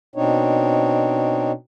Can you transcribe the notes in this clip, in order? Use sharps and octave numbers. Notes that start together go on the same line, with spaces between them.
B2 C4 D4 D#4 C#5